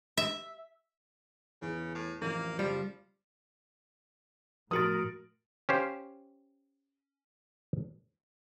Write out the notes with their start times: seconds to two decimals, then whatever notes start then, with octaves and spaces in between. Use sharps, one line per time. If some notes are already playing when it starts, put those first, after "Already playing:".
0.17 E5
1.62 E2 C#3
1.95 A2
2.22 A1 F2 A#3
2.59 F#1 F3 G3
4.71 A2 F3 F#4 A#4 D#6 A6 D7
5.69 C#4 G4 C5 F5